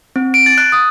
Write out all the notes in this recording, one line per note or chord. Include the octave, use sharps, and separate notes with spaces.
C4
D7
A6
F#6
D#6